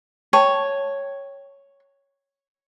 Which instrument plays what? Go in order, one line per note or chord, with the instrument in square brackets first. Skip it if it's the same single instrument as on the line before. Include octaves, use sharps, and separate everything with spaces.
[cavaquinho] C#5 [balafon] G5 A5